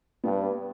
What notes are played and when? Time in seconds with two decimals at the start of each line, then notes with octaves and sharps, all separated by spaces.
0.24 G2 B3